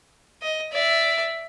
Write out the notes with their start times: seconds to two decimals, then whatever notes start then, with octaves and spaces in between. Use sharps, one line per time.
0.42 D#5
0.72 D5 E5